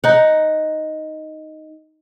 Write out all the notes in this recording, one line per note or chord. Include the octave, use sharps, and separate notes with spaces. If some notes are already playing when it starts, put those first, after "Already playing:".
D#4 F#5